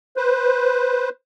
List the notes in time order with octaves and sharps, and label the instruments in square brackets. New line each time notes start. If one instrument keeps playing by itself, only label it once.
[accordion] B4 C5